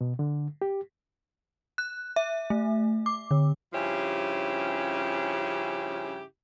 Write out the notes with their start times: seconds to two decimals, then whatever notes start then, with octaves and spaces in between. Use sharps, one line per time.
0.01 B2
0.19 D3
0.62 G4
1.78 F#6
2.16 E5
2.50 A3
3.06 D6
3.31 D3
3.73 G2 C#3 F3 C#4 E4 G4